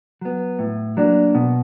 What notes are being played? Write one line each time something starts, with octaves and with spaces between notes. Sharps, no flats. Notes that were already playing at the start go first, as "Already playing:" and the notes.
F#3 B3
A2
F#3 A#3 D4
B2